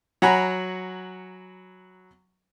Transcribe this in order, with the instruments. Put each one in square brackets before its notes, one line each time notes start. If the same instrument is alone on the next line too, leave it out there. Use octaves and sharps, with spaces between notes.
[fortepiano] F#3 F#5 G#5 A#5 B5